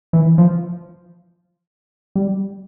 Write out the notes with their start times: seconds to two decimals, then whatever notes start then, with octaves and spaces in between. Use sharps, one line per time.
0.13 E3
0.38 F3
2.15 G3